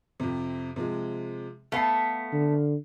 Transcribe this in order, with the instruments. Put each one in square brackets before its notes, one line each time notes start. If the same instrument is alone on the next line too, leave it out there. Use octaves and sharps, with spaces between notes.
[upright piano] F2 C3
C3 F3 G#3
[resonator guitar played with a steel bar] A3 B3 [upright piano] F5 C7
[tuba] D3